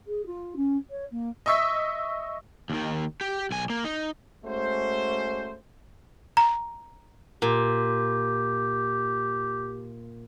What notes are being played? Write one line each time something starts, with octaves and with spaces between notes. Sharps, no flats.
G#4
F4
C#4
C#5
A#3
D#5 E5 C#6 E6 B6
D#2 D#3
G4
B1 G#5
A#3
D#4
G#3 A3 C#4 F#4 C5
A#5
A#2 G4